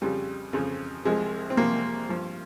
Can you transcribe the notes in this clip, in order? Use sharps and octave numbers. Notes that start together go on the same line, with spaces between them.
F2 C#3 F3 G3
F2 C#3 F3
C2 C3 F3 G#3
C4
C2 C3 F3 A#3
G2 F3